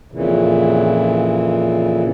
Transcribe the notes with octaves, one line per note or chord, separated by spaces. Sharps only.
F2 A#2 C#3 E3